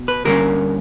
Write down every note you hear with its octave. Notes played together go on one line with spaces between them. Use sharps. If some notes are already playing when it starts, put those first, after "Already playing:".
Already playing: B2
B4
G2 D3 G3 A#3 C#4 A#4